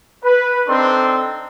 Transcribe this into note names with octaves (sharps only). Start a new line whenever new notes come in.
B4
C4 D4 D#4 A4 C6